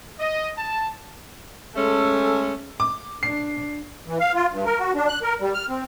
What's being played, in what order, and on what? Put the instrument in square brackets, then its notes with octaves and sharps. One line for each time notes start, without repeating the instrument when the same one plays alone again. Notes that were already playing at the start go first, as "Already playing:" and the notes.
[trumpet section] D#5
A5
[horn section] G#3 A3 C#4 [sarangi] A4
[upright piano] D6
[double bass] D4 [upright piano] C7
[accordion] E3
F5
F4
G2
A#4
F#4
D4
F#6
A#4
G3
F6
C4